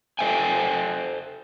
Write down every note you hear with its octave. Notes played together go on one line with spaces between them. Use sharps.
A4 C5 E5 G5 G#5